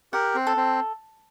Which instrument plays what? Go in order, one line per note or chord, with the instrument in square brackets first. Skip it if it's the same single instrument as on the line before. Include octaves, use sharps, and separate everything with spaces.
[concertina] G4 A#4 [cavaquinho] F#5
[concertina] C4
[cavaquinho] A4
[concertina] C4